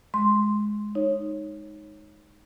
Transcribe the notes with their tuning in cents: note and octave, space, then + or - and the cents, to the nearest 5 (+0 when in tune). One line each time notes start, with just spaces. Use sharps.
G#3 +10 C6 +0
D#4 +0 C#5 -15